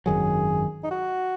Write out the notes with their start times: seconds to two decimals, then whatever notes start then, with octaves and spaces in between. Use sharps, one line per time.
0.06 G#1 F#2 D#3 F#3 G#4
0.84 D#4
0.91 F#4